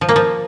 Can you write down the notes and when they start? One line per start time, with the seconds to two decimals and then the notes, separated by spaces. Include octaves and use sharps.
0.01 F3
0.09 A#3
0.16 F3